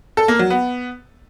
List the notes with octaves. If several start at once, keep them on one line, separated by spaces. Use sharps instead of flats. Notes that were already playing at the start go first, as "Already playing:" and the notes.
A4
A#3
F#3
B3